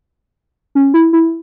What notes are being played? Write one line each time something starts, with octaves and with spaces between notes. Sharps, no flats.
C#4
E4
E4